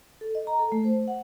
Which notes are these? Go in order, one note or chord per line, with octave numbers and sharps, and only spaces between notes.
A4
D#5
A#5
A4
A3
C5
F#5